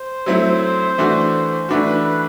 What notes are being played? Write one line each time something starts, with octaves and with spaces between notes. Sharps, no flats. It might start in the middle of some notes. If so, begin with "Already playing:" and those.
Already playing: C5
F#3 A3 C4 E4
E3 A3 D4 F#4
E3 A3 D4 F#4 B4
B4
B4